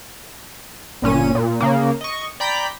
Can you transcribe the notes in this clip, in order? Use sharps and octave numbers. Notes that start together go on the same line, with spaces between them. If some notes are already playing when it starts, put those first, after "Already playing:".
G1 A#2 C#4 D#7
A#2
C#3 A#3
D#5 C#6
D5 G5 A#5 B5 G6 B6